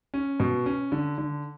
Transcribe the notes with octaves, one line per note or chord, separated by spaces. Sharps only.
C#4
B2
C#4
D3
D3